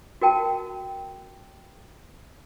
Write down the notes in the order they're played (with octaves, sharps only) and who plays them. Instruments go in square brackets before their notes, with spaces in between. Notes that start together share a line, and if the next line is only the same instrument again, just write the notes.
[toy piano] F#4 A#4 G5 A5